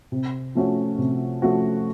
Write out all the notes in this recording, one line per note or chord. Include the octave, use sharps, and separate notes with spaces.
C3
F3 A3 C#4 F#4
C3
F3 A3 C#4 F#4